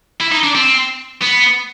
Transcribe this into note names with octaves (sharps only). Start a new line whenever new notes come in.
E4
D#4
D4
C4
B3